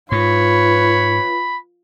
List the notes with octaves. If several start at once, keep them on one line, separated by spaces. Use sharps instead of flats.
G#2 F4 B4 C#5 B5